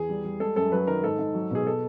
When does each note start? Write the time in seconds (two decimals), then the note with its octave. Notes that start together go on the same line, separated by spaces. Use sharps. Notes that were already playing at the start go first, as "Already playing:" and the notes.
Already playing: E2 G#4
0.09 G3
0.24 G3
0.40 G#3 A4
0.56 F#2 A4
0.72 F#3 B4
0.87 D#3 A#4
1.04 G#2 A4
1.19 G#2
1.34 F#3
1.51 B2 G#4
1.67 A4